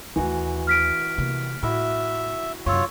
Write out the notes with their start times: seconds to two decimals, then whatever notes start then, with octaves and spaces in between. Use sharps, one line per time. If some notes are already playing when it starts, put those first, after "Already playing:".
0.16 D#2 E3 A3 F#4 G#5
0.67 F6 B6 D7
1.18 C3 A#3
1.63 A2 E4 F#4 E5 B5
2.66 F#2 C3 F4 C#5 C#6 E6